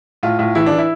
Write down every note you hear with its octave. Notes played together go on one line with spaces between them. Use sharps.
A2 F4
A2 F4
E3 E4
E3 D4
E4